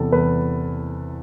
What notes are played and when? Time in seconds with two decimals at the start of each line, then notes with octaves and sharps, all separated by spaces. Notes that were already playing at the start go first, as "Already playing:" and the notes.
Already playing: E2 C3 A4
0.12 E2 B4